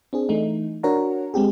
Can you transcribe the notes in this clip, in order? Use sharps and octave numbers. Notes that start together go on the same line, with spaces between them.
C4 D4 G#4
E3 A3 D#4
D4 F#4 A#4 C#5 F#5 A#5
G#3 C4 G4 G#4